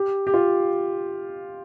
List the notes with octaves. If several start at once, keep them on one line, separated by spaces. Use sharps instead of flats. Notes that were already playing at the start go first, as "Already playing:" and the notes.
Already playing: G4
G4
F4